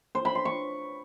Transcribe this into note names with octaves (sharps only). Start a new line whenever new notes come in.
C5
B5
C6
C#6